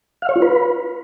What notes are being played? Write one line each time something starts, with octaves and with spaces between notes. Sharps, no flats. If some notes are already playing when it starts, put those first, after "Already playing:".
F5
C#5
F4
B4